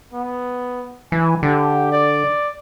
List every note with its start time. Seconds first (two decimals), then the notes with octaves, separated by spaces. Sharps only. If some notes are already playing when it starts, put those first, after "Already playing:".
0.13 B3
1.12 E3 G#5
1.43 D3 G4
1.92 D5